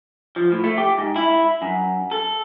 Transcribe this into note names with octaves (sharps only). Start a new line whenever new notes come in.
F3
A2
A3
G4
G#2
E4
F#2
A4